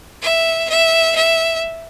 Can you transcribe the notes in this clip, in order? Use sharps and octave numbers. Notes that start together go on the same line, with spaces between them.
E5
E5
E5